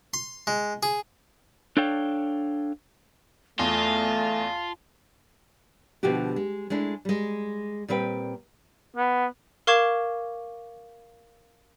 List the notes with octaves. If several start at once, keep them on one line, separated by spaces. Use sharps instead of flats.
C6
G#3
G#4
D4 A4 C#5 F5 G5
E2 A3 F4 A5
B2 D3 F3 F#4 G4
G#3
G#3 A3 D4 E4
G3 G#3
A#2 G3 C4 B4 G5
B3
A#4 F5 C#6 D6 G#6 E7